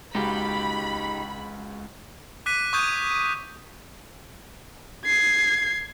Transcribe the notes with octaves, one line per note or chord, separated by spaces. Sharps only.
C#2 G#3 D#4 F#4 G4 F5 B5
D6 F#6 B6 D#7
C#6 D#6 G6 G#6 D#7
G#6 C7